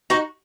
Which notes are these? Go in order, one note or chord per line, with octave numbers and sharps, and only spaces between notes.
D#4 F#4